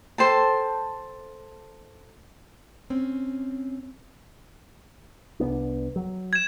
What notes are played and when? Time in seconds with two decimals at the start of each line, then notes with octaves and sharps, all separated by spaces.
0.18 A4 C5 G5 A5
2.90 C4 C#4
5.40 C2 B3 D4
5.96 F#3
6.33 G#6 E7